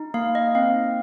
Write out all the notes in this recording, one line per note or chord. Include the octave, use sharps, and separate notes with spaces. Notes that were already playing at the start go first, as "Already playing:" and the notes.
Already playing: D#4
A#3 F5
D#5
C4 F5